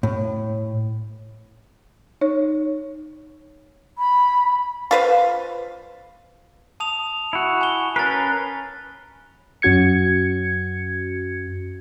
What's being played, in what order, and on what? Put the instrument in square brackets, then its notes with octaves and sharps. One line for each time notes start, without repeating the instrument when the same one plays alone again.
[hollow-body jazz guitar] A2
[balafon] D#4 C#5
[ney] B5
[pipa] F4 B4 C5
[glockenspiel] A5 D#6 F7
[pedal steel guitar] E4 F#4
[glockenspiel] G#5 G7
[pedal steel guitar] C#4 A#4 B4 [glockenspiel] A6 C7
[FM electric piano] F#2 C#4 F#4 G#6 C#7